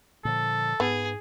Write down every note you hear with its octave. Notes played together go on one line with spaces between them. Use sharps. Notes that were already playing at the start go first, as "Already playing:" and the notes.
A#2 D3 F3 A4
G#2 B3 G#4